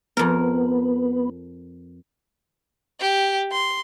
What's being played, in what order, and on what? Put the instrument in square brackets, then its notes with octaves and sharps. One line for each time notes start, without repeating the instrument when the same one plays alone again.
[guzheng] F2 A#4 [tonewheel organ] B3
[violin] G4
C6